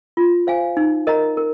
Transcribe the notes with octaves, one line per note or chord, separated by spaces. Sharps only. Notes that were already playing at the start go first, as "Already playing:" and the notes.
F4
C5 F5 G#5
D#4
A#4 D#5 A#5
A#4